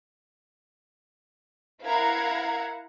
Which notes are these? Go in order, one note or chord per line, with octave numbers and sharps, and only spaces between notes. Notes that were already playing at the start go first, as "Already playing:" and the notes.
E4 A#4 F5 F#5 A#5 G#6